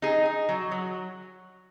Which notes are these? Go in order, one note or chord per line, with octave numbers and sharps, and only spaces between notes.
D#4 G#4
D#4
F#3
F#3